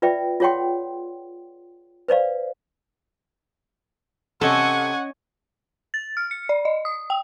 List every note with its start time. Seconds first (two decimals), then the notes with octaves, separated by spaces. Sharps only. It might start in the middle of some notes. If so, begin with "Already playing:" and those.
0.02 F4 B4 D5 E5 G5
0.40 F4 G#4 C#5 F#5 G5 C6
2.08 B4 C5 D5 F5
4.41 C3 C#4 A4 D#5 F#5 G#5 C#6
5.94 A6
6.17 F6
6.31 C#7
6.49 D5
6.65 D#5
6.85 D#6
7.10 G5